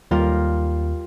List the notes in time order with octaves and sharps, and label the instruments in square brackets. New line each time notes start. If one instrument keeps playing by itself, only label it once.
[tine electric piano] D#2 [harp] G3 F4 A#4